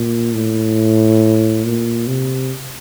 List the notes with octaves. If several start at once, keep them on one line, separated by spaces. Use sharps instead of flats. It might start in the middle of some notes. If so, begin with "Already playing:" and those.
Already playing: A#2
A2
A#2
C3